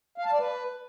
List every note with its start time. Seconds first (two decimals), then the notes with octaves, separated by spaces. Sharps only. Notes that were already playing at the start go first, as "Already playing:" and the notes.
0.18 F5
0.25 A5
0.32 D5
0.39 B4